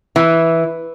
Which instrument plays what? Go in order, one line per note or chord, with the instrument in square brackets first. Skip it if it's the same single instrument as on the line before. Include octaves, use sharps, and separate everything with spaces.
[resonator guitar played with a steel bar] E3